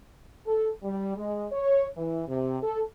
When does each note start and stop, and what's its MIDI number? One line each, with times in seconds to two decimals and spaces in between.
0.47 0.70 69
0.83 1.15 55
1.17 1.47 56
1.52 1.87 73
1.97 2.22 52
2.28 2.57 48
2.63 2.81 69